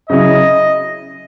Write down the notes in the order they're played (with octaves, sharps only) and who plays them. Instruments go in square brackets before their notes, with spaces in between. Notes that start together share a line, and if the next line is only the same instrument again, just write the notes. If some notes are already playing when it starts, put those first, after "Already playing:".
[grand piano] C#3 F#3 C#4 E4 [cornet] D#5